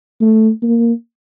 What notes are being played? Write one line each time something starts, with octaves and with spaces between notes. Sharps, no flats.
A3
A#3